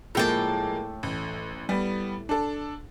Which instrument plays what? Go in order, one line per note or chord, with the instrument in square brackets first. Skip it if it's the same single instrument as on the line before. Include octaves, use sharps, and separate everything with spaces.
[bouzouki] A2 G5 A5 [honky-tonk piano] F3 G#3 A#3
[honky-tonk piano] A1
G3 B3
D4 A4